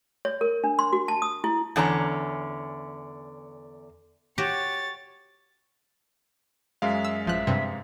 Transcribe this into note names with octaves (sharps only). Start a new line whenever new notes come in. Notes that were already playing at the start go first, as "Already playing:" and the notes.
C#5
A#4
D4
C6
F#4
A5
D#6
E4
E2 D3 C#4 A#5
F#4 G4 C#5 A6
F#2 G#3 E5 F5
E6
A1 F3 E5 F#6
G2 C3